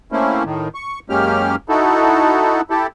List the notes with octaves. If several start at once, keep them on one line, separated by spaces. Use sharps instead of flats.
A3 A#3 C4 C#4 E4
A2 D#3
C#6
F#2 G#3 A#3 C#4 G4 F6
D#4 E4 F#4 A4
E4 G4 A4